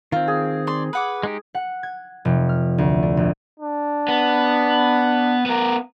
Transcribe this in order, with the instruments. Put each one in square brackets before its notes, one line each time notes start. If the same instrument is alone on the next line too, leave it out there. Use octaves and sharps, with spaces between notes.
[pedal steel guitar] D#3 C4 [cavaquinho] F4
[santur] G#4
[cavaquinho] D5 C6
B4 F#5 D6
[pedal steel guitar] G#3 D#4 G4
[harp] F#5
G#6
F1
F6
D2
D4
A#1
[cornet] D4
[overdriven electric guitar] B3
B3 A#4